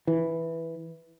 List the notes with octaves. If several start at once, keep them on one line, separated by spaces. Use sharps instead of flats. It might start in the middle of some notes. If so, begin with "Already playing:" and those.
E3